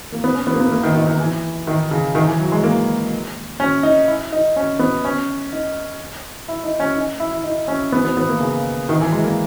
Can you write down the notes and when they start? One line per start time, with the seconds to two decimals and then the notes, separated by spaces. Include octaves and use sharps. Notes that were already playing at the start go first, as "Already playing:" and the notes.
0.12 A#3
0.24 B3
0.35 C#4
0.47 B3
0.54 A#3
0.60 B3
0.72 A#3
0.83 D#3
0.95 D#3
1.07 D#3
1.20 E3
1.67 D#3
1.91 C#3
2.15 D#3
2.28 E3
2.40 F#3
2.52 G#3
2.64 A#3
3.60 C#4
3.83 D#4
4.07 E4
4.32 D#4
4.56 C#4
4.79 B3
5.05 C#4
5.53 D#4
6.48 E4
6.64 D#4
6.80 C#4
6.97 D#4
7.20 E4
7.32 E4
7.44 D#4
7.68 C#4
7.92 B3
8.05 B3
8.17 B3
8.29 A#3
8.41 C#3
8.89 D#3
9.01 E3
9.13 G#3
9.24 A#3